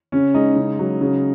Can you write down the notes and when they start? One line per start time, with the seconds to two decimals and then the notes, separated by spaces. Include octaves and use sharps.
0.12 C#3 C#4
0.34 G#3 D#4
0.56 C#3
0.79 F#3
1.01 C#3